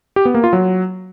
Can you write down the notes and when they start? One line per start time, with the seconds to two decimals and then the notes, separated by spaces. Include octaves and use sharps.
0.16 G4
0.25 B3
0.35 A#3
0.44 F4
0.53 F#3